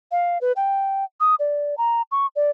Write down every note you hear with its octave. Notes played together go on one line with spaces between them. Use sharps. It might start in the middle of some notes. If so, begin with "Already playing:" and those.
F5
B4
G5
D#6
D5
A#5
C#6
D5